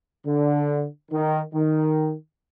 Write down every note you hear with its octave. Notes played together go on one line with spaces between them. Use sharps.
D3
D#3
D#3